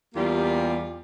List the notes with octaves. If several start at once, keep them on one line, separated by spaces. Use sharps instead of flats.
E2 G3 A#3 F4 G4